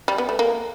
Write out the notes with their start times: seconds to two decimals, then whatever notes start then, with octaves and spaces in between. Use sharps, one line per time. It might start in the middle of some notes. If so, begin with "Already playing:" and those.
0.08 G3
0.18 B3
0.29 A3
0.39 A#3